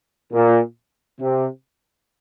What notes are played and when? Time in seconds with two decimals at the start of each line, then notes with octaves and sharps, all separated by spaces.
0.33 A#2
1.20 C3